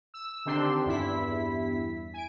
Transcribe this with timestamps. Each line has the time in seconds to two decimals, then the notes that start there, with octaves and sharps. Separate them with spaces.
0.14 E6
0.45 D3 D#3 C4 D4 G4 C6
0.86 E2 G2 E4 B6
2.14 G#5 D7